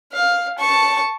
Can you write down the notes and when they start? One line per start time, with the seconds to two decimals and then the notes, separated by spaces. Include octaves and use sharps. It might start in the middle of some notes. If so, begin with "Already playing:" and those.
0.13 F5
0.58 A5 C#6